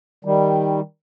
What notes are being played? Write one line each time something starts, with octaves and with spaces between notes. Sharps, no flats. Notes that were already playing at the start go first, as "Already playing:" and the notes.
D#3 G3